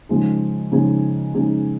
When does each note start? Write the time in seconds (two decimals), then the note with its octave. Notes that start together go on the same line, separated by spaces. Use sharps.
0.09 C#3 F3 G#3 D#4 G#4
0.72 C#3 F3 G#3 D#4 G#4
1.34 C#3 F3 G#3 D#4 G#4